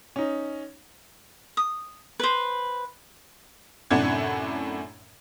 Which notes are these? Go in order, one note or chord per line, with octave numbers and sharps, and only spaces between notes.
C#4 D#4
D#6
B4 C5
F#2 A2 C3 D4 F#5 G#6